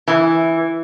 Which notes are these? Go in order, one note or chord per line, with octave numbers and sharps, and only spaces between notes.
E3